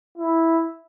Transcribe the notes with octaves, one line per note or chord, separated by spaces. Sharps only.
E4